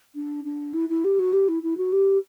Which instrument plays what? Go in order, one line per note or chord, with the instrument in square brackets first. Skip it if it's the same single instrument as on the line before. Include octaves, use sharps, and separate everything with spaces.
[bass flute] D4
D4
E4
E4
G4
F#4
G4
E4
E4
F#4
G4